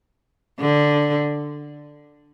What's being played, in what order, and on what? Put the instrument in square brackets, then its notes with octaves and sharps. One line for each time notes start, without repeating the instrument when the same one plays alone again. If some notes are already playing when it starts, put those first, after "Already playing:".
[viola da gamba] D3